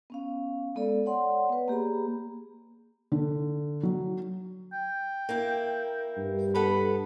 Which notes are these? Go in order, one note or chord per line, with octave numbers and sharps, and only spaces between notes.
B3 C#4 F5
G#3 B3 A4 D5
C#5 D5 F#5 G#5 C6
B3 B4
A#3 G4 G#4 B5
D3
F#3
G5
A#3 E4
G2
B3 A4 F#5 B5